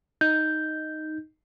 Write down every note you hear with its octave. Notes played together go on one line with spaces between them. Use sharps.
D#4 G6